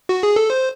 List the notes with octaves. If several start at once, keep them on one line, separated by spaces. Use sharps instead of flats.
F#4
G#4
A4
C5